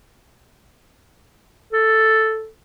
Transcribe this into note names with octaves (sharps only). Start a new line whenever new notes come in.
A4